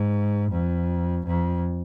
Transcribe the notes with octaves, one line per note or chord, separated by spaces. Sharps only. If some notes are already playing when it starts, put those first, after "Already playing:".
Already playing: G#2
F2
F2